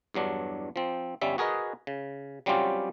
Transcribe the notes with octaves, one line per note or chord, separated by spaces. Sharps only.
E2 G2 F#3 D4
F3 C4
G1 G3 C#4 E5
F#4 G#4 A#4 B4 D#5
C#3
F#3 G3 C4 C#4 F4 G4